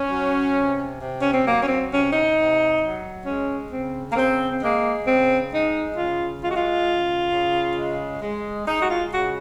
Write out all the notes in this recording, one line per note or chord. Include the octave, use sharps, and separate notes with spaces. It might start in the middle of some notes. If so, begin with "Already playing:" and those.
Already playing: C#4
F#3
C3
C3
C#4
C4
F#3 A#3
C#4
C4
C3 C#4
D#4
C3
F#3
G#3 C#4
C#3 C4
A#3
C#3 C4
C4
G#3 A#3
C#3 C4
G#3 D#4
C#3 F4
G#3 F4
F#4
F4
C#3
C#3
G#3
G#3
G#3 D#4
F#4
F4
C#3 F#4